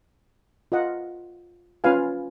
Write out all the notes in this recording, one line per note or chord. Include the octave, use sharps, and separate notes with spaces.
F4 A#4 D#5 F#5
C#4 F4 B4 F5 G#5